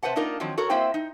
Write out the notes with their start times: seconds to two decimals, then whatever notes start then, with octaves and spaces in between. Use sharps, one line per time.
0.03 C3 B4 C5 F#5 A5
0.16 A#3 D4 D#4 F4 A#4
0.40 D#3 F3 F#3 C4
0.58 F#4 A4 A#4 C#5
0.70 A#3 C4 E4 C5 G5
0.94 D#4